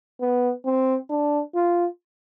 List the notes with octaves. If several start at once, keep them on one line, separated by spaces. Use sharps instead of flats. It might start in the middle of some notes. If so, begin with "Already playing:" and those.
B3
C4
D4
F4